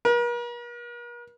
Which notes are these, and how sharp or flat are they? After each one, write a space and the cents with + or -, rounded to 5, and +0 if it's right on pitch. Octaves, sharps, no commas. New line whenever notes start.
A#4 +45